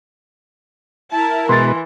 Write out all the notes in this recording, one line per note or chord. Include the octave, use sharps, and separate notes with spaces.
E4 A#4 A5
B2 E3 G#3 B4 C6 A6